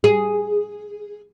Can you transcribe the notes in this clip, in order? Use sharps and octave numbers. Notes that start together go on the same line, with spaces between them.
G#4